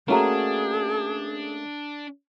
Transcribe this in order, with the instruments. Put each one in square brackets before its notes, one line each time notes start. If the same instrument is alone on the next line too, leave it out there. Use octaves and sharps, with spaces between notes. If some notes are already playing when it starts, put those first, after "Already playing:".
[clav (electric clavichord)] A3 A#3 [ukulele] C#4 F#4 A#5 [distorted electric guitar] D4 [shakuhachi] G#4